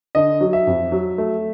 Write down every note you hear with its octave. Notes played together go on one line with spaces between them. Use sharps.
D3 D#5
F#3
E5
F2
F#3
A3